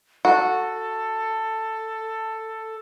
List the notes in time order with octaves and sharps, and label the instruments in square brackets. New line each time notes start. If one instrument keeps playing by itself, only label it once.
[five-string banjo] F#4 [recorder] A4